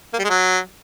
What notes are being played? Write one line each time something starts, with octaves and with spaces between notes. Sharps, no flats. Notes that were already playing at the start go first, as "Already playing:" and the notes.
A#3
G3
G#3
F#3